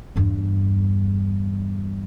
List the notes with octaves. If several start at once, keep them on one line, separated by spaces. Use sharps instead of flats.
E2 G2